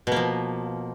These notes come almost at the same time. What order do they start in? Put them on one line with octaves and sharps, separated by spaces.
B2 A#3 F3